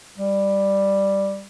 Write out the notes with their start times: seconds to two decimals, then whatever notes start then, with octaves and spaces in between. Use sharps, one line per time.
0.17 G3